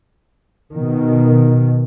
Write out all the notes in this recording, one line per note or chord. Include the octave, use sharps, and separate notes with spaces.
B2 D#3